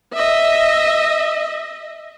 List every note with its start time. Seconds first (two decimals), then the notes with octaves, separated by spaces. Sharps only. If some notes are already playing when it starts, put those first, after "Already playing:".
0.14 D#5 E5